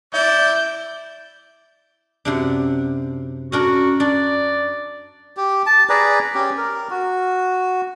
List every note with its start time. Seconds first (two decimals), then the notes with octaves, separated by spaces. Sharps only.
0.14 E4 D5 E5 G6
2.25 F#2 C3 D4
3.52 C#4 D4 F#4 A#4
4.00 D4 D5
5.37 G4
5.66 A5
5.89 G#4 B4 D5 A#5
6.35 C#4 G4
6.57 A#4
6.90 F#4